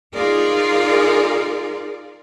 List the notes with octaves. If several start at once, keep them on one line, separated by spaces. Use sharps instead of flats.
D#4 F4 G#4 A#4 D5